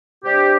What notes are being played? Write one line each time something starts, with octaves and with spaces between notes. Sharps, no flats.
C3 G3 D4 G4